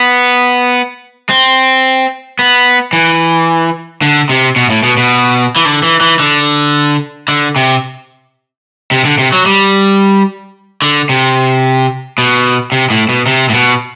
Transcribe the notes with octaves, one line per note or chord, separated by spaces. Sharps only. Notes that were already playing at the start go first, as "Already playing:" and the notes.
Already playing: B3
C4
B3
E3
D3
C3
B2
A2
B2
B2
E3
D3
E3
E3
D3
D3
C3
C3
D3
C3
F#3
G3
D3
C3
B2
C3
A2
B2
C3
A2
B2